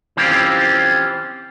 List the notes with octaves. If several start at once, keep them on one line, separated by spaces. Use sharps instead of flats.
E3 C4 C#4 F4 G4